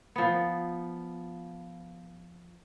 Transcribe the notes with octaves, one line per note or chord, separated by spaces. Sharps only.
F3 B3